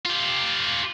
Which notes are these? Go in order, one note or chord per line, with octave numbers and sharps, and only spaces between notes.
F4 G4